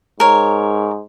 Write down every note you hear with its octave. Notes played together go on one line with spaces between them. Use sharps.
G#2 A#4 C#5